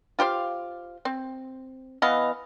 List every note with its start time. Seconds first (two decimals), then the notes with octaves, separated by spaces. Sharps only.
0.19 F4 G4 C5 F5
1.05 C4
2.02 E3 B3 D#5 F5